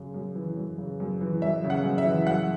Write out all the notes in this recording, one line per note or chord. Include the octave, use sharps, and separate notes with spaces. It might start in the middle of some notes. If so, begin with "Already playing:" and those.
Already playing: F#2 C#3
F#2
E3
F#2
C#3
F#2
E3
F#2 E5
C#3
F#5
F#2
E5
E3
F#2 F#5